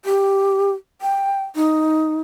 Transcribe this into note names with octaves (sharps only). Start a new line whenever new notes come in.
G4
G5
D#4